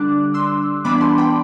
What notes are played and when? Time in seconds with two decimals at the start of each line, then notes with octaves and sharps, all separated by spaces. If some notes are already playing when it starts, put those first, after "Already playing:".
Already playing: D3 G3 D4 D6 F#6
0.34 C6 E6
0.85 E3 G3 B3 D4 B5 D6
1.01 A5 C6
1.18 G5 B5